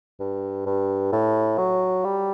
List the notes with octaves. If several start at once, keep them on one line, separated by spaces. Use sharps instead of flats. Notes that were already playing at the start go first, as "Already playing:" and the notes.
G2
G2
A2
F#3
G3